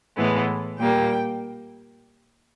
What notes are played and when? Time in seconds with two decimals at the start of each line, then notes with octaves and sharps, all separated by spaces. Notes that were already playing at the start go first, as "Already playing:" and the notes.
0.17 A2 E3 G#3 B3
0.79 A#2 G3 A#3 G5